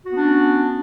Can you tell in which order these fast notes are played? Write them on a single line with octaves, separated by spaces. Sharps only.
F#4 B3 D4 C#4